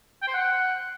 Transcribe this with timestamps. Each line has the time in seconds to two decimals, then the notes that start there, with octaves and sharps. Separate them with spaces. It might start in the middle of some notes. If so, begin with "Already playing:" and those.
0.22 G5
0.28 C5
0.34 F#5